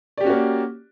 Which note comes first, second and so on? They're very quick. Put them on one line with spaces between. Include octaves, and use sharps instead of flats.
D5 G4 C#4 F#4 A#3